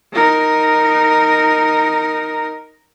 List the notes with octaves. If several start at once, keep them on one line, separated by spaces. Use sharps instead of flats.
D#4 A#4